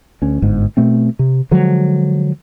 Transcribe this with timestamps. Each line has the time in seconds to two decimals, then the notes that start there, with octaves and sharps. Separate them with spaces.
0.22 D2 C#4
0.42 G1 G#2
0.77 B2 A3 C4
1.19 C3
1.51 D3 F3 F#3 G#3